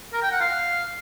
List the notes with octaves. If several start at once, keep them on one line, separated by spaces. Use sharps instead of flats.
A#4
G5
F#5
F5